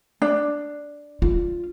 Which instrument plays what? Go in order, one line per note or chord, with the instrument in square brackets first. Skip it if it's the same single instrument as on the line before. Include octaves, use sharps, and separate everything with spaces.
[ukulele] D4
[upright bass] F4